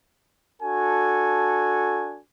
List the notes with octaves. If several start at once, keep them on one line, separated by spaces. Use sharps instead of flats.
D4 F#4 A4 G#5